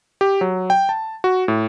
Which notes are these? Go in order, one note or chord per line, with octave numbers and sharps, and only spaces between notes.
G4
F#3
G5
A5
F#4
A2